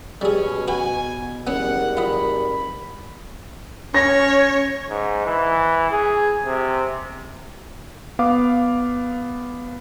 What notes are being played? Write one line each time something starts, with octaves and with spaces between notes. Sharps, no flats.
B2 G3 C#4 G#4
F#4 B4 G#5
F#1 G3 B3 C#4 A#4 F#5
F4 D#5 B5
C#4 C#5 A#6
G#2
E3
G#4
C3
B3 F5 D6